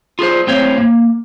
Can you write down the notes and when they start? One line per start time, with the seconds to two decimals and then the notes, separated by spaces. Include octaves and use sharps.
0.19 F4 G#4 A4 C5
0.47 A2 C4 C5 C#5 F5
0.78 A#3